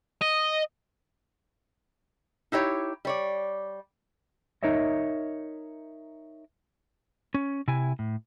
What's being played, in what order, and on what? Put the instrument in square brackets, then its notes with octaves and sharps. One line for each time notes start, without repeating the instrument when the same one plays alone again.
[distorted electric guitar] D#5
[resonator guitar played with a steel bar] D#4 E4 G4 C#5
G3 C#5 D5
[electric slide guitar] D#4 A#4 C#5 D#5 E5
C#4
C3 E4 G#5
A2